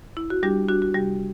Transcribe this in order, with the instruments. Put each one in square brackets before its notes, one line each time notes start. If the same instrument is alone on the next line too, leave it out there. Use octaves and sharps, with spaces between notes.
[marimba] E4
F#4
G3 D4 G4
D4 F#4
F#4
C3 G3 G4